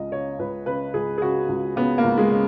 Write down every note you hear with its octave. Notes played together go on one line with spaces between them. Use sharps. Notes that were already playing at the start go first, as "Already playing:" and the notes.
Already playing: C#2 C#3 D#5
C#3 C#5
C#2 B4
C#3 B4
C#2 G#4
G#4
C#3 F#4
C#2
C#3 B3
A#3
C#2
G#3
C#3